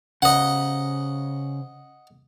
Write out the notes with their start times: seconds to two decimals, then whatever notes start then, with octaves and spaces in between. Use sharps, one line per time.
0.22 C#3 C5 D#5 F#5